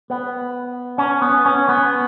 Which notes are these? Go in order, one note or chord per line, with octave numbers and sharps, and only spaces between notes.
B3
C#4
B3
C#4
B3